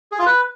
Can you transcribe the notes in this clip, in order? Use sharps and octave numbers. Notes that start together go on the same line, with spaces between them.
G#4
F4
B4